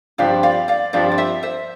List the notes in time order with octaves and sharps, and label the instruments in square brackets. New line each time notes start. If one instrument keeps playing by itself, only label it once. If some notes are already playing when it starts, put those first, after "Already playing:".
[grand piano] G2 F3 C4 G4 [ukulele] D5 F5
[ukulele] D5 F5
D5 F5
[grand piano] G2 F3 C4 G4 [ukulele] D5 F5
[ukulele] D5
C5 E5
C5 E5